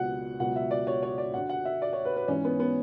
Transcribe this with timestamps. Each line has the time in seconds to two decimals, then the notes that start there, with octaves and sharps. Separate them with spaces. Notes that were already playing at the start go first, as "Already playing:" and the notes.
Already playing: C#2 B2 F#3 F#5
0.40 C#2 B2 F#3 F#5
0.56 E5
0.71 D5
0.87 C#5
1.03 C#5
1.18 D5
1.34 F#2 D3 F#3 F#5
1.49 F#5
1.65 E5
1.82 D5
1.93 C#5
2.05 B4
2.16 B4
2.28 G#2 E3 C#4
2.45 B3
2.60 B3